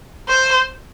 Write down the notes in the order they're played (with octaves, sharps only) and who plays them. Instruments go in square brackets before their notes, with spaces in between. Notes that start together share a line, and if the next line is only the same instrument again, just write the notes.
[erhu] C5